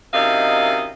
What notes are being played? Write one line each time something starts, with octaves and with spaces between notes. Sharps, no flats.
F#2 C3 D#4 E4 D#5 F5